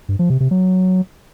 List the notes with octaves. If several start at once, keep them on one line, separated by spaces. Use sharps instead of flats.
G2
F3
C3
C3
F#3